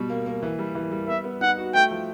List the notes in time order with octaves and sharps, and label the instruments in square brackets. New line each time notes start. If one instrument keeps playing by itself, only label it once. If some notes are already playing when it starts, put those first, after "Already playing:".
Already playing: [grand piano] B2 G3
A#3
A#3
E3
G3
E3
G3
[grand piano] B3 [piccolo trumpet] E5
[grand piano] B3
[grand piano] D#4 [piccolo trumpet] F#5
[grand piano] F#4
[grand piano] A3 [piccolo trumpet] G5
[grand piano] F3